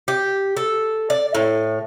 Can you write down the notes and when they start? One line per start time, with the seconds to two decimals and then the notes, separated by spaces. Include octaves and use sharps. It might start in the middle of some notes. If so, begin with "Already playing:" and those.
0.08 G4
0.57 A4
1.10 D5
1.35 A2